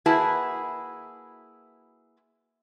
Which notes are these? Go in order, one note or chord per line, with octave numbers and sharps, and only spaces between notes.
A#3 E4 F#4 G#4 B4 A5